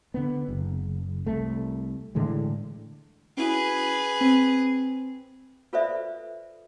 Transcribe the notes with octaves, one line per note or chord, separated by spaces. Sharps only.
D3 B3
F#1
C2 A3
A2 D3 E3 G#3
C#4 E4 F#4 G#4 B4
C4
F4 A4 B4 C5 D5 E5